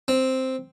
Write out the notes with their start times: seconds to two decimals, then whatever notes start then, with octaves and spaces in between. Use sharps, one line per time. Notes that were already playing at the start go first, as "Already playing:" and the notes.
0.08 C4